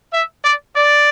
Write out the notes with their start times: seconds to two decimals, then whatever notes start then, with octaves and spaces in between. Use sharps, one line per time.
0.13 E5
0.44 D5
0.76 D5